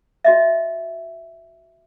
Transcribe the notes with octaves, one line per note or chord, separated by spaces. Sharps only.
F#4 D#5 E5